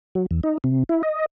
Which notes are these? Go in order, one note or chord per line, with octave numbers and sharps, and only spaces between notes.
F#3
E2
D#4
C3
E4
D#5